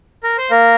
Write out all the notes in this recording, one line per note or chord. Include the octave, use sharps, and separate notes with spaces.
A#4
C5
A#3 A#4